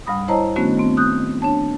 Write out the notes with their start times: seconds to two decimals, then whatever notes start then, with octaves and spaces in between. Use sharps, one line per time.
0.07 D2 G#2 G3 B5 D#6
0.28 E4 C5 C#5 D#5 A5 A#5
0.56 D#3 A3 B3 C#4 D4 F#4
0.77 A3 B3 C4
0.97 D#6 F#6 G6
1.42 D4 C#5 A5